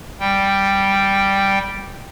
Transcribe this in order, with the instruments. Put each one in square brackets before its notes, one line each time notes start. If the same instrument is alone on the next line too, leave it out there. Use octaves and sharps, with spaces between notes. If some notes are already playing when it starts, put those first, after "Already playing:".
[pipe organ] G3 G5